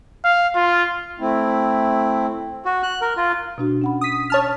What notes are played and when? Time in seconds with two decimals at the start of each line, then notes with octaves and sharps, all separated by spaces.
0.24 F5
0.55 F4
1.20 A3 C4 E4
2.65 F#4
2.83 F#6
3.01 A#4
3.17 F4
3.58 B2 D4 F#4
3.82 C#4 F#5 B5
4.01 D#6 B6
4.30 C#5 A5 F6